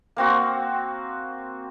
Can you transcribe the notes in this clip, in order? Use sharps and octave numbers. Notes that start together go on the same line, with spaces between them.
A#3 C4 F#4